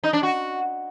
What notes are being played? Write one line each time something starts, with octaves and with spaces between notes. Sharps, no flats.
D#4
D4
F#4